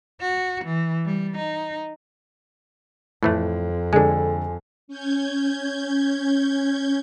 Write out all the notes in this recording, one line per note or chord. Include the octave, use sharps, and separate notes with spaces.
F#4
E3
G3
D#4
F2 A2 E3 A3
D3 G#3 D4 A4 G#5
C#4 G6 G#6